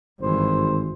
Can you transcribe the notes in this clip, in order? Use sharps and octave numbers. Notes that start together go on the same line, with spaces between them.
G#1 G2 E3 C5